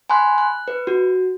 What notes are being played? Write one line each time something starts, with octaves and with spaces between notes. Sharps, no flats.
G#5 B5 C6 F#6
F#6
B4
F#4